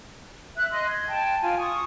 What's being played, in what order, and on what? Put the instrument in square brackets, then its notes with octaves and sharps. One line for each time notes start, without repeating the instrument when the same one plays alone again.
[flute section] E5 F#6
D#5 C6 F#6
G#6
G5 A5
F4 G#5
C#6 D#6